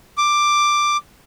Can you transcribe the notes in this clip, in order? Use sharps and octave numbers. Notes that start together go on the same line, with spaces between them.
D6